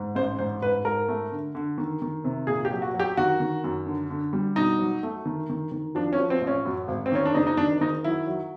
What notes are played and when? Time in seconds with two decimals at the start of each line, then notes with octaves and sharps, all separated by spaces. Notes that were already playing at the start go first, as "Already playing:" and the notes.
Already playing: G#2
0.15 A1 C5
0.39 G#2 C5
0.62 G#2 B4
0.85 G#2 A#4
1.08 A3
1.32 D3
1.55 D3
1.78 D#3
2.02 D#3
2.24 C3
2.47 A#2 G#4
2.65 G4
2.71 F#3
2.82 F#4
2.94 F#3
2.99 G4
3.17 D#3 F#4
3.40 D#3
3.64 F#2
3.86 D3
4.10 D3
4.33 G3
4.56 B2 D#4
4.79 F#3
5.03 A3
5.25 D#3
5.49 D#3
5.72 D#3
5.95 F3 D4
6.13 C#4
6.19 F3
6.30 C4
6.42 A1
6.47 C#4
6.65 F#2
6.88 G#1
7.06 C4
7.12 D#3 C#4
7.26 D4
7.35 F#1 D#4
7.47 D#4
7.57 D#3 D4
7.81 D#3 D#4
8.04 F#3 E4
8.27 F#3